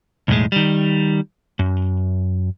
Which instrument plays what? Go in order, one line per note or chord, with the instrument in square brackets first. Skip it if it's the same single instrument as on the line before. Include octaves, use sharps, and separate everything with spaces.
[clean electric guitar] B1 E2 A2 G#3
D#3 G3
F#2